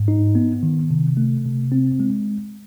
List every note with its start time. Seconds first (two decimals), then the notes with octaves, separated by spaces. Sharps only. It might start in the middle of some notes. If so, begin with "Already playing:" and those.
Already playing: G#2
0.08 D#4
0.35 B3
0.63 D#3
0.91 C3
1.17 A3
1.45 C3
1.72 C4
2.00 G#3